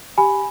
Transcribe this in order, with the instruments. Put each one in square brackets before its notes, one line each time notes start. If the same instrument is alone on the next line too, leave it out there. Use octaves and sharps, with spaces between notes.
[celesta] G4 G#5 B5